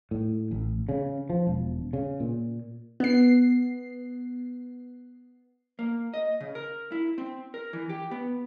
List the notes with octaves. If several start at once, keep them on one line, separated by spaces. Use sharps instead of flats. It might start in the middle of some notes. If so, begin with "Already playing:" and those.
A2
A1
C#3
F3
E1
C#3
A#2
B3 C7
A#3
D#5
C#3
A#4
E4
C4
A#4
E3
G4
B3